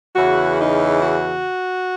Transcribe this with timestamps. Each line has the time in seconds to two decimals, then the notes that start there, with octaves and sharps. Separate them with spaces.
0.15 E2 C#3 E3 F#4
0.59 D#4
1.01 F#4